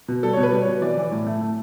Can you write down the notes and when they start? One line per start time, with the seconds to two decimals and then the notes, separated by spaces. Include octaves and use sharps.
0.08 B2
0.23 G3 A4
0.33 C#5
0.37 B2
0.43 B4
0.52 G3
0.62 C#5
0.67 B2
0.82 E3 D5
0.97 E3
1.11 A2
1.27 A3
1.41 A3